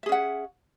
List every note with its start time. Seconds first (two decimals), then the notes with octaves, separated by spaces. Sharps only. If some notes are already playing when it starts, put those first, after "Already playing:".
0.03 E5
0.06 G#4
0.09 C#4
0.12 F#5